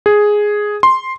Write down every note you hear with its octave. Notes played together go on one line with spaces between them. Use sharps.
G#4
C6